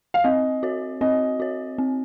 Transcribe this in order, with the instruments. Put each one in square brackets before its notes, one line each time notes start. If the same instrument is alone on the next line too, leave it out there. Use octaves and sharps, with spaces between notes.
[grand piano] F5
[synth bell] C4 [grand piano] D#5
[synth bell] F#4 C#5
[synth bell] C4 [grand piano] D#5
[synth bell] F#4 C#5
C4